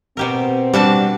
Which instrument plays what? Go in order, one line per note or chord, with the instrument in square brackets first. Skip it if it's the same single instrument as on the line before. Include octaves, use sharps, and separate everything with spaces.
[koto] B2 G4 A#4 [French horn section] C4
[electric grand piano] G3 [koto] D4 F#4 A5